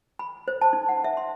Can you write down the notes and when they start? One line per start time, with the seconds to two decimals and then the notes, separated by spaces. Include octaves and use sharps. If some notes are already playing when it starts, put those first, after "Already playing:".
0.19 B5
0.48 C5
0.61 A5
0.73 D#4
0.89 F#5
1.04 E5
1.17 C6